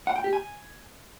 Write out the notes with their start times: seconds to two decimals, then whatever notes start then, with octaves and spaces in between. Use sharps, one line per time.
0.07 F#5
0.16 G5
0.24 G4
0.33 G#5